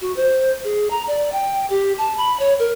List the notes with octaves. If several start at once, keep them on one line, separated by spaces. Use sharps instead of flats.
F#4
C5
G#4
A#5
D5
G5
G4
A5
B5
C#5
A#4